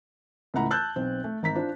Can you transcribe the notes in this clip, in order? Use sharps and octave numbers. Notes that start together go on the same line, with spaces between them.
C#2 A2 A3 F#5 A#5 B5
A5 E6 F#6 G6 A6
B1 C4
A3
G#1 A#5 B6
D4 F4 C5